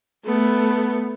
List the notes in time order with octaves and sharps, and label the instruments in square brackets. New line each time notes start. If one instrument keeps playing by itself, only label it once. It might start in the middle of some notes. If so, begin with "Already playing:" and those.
[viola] A3 B3